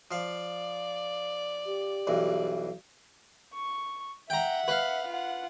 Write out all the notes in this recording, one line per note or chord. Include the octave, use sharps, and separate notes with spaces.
F3 D5 F5
G4
B1 G2 E3
C#6
E5 F#5 G5 A#5
B4 F5
F4 F#5